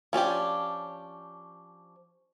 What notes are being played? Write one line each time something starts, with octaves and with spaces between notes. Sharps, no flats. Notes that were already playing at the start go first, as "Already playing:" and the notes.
F3 C#4 D4 G4